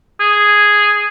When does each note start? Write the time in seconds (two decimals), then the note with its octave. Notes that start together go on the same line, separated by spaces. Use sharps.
0.20 G#4